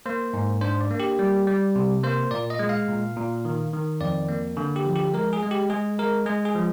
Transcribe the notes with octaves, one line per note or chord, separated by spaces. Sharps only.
A#3 C5
G#2
D4 C5
D5
A#3
G4
G3
G3
C3
A#3 C5
A#2 D5
D#5
G#3
F5
A#2
A#2
D#3
D#3
F2 D5
A#3
D3
G4
F3
G4
G#3 A#4
G#4
G#3
G4
G#3 G#4
G#3 A#4
G#3 G#4
G#4
F3